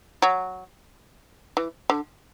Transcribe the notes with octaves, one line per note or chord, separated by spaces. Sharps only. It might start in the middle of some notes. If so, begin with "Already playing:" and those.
F#3
E3
D3